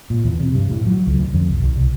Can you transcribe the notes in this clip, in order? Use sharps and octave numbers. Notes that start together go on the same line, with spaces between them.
A#2
E2
C3
G2
A2
F#3
C#2
D2
F2
C2
C2
C2